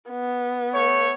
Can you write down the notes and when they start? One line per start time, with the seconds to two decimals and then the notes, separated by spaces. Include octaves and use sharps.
0.10 B3
0.73 A3 C#5